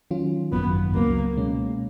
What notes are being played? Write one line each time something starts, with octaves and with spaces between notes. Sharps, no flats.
D#3 F#3 C#4 F4
G#1 F#2 D#3 F#3 B3
C#2 C#3 F#3 A#3 B3
B2 G#3 C#4